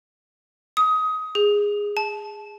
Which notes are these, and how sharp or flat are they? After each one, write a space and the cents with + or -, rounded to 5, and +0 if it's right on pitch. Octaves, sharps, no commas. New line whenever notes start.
D#6 +20
G#4 -10
A5 -20